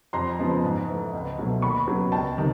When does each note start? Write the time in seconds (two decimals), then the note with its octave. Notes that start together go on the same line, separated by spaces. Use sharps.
0.13 F2 A#5 C6
0.39 C#3 F3 G#3 B3
0.64 G#2
0.88 E3 A3
1.13 C#2
1.38 B2 F#3 A3
1.62 D#2 B5 C#6
1.87 C#3 F#3 B3
2.12 C#2 G5 A5
2.37 C3 D#3